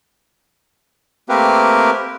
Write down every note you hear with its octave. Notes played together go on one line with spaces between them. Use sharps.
A3 A#3 C4 G4 A#4 B4